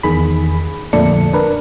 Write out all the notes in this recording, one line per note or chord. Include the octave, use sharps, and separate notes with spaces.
E2 D#3 G#4 B5
F2 A#2 D3 A3 D4 C#7
D4 A#4 B4